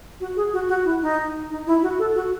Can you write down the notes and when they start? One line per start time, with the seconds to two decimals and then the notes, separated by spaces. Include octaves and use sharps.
0.20 F#4
0.36 G#4
0.53 F#4
0.68 F#4
0.85 E4
1.02 D#4
1.51 D#4
1.67 E4
1.82 F#4
1.99 A4
2.15 F#4